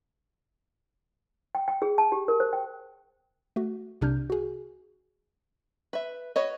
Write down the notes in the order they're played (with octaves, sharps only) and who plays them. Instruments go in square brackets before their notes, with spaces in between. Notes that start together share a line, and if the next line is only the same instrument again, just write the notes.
[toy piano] G5
G5
G#4
A5
G4
A#4
C5
G5
[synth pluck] A3 F#4
C2 C3 D4 F6 G6
F#4 G#4
[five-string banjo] B4 E5
F#4 B4 C#5 D#5